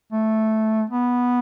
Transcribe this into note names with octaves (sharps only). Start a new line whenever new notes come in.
A3
B3